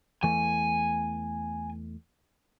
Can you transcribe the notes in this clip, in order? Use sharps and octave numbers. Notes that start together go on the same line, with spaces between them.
E2 E3 A3 G#5